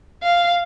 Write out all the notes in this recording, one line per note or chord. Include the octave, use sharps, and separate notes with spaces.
F5